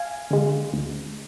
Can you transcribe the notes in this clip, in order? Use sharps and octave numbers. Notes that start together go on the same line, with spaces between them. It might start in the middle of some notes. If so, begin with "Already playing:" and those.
Already playing: F5 G#5
D3 G#3
D2